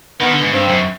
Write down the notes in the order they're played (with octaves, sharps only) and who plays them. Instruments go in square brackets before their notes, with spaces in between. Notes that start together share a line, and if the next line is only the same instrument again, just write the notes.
[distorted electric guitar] D#3 [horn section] B3
[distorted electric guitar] D3
G#2
[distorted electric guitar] G2 [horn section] C4
[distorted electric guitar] F#2